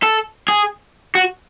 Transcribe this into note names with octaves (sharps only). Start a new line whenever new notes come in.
A4
G#4
F#4